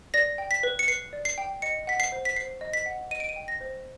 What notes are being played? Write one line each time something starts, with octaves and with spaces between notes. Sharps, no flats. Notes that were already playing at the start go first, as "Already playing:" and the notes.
D5 A#6
G5
B6
B4
C#7
B4 C7
D5
C7
G5
D#5 C#7
F#5 B6
C7
C5
B6
C5 C7
D#5
B6
F#5
D#5 D#7
D7
D#7
G5
A#6
C5